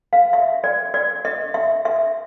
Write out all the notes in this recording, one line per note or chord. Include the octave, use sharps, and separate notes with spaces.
F5
E5
D5
D5
D#5
E5
E5